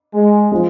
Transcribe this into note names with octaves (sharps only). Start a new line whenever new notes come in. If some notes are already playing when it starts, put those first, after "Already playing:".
G#3
F3 G#3